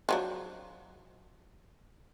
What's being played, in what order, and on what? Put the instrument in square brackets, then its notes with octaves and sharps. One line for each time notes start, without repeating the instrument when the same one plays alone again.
[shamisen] F3 F#3 D4